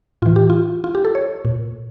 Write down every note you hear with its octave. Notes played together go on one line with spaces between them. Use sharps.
A2 E3 F4
G4
F4
F4
G4
A4
C#5
A#2